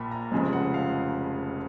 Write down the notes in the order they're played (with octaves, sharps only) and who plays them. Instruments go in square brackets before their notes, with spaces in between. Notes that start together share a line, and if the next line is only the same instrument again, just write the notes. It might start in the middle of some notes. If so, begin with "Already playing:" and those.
Already playing: [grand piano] A#1 A#2 B5
A#5
F1 F2 C#3 G#3
F#5
F5